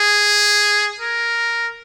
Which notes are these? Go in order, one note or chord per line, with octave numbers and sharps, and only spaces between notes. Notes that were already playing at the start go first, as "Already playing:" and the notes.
Already playing: G#4
A#4